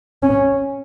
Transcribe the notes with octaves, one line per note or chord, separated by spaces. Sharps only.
C#4